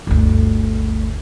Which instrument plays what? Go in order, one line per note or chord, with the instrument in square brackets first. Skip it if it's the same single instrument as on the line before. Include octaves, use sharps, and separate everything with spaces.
[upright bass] G1 D2